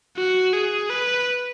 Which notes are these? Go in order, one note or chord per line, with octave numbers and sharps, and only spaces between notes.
F#4
G#4
B4